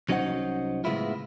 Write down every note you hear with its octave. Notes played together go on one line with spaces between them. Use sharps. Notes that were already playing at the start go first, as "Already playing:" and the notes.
C2 F#3 C#4 D#4 C5 F#5
A2 C#3 G#3 B3 E4 F4